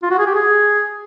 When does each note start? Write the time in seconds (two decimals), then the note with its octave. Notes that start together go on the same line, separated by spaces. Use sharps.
0.03 F4
0.11 F#4
0.19 G#4
0.27 G4
0.35 G#4